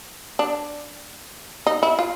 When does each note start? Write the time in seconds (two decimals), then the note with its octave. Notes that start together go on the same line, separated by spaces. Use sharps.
0.39 D4
1.67 D#4
1.83 E4
1.99 F4